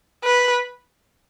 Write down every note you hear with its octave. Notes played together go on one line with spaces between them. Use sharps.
B4